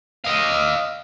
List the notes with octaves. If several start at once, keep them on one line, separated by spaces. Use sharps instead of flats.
D#5 F5